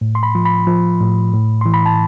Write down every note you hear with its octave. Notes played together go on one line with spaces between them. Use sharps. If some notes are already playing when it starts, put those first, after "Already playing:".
A2
C6
B5
F3
B5
F3
A2
A2
E3 C6
B5
A5